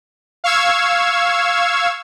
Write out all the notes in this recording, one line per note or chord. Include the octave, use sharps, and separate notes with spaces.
F5 C#6 E6 G#6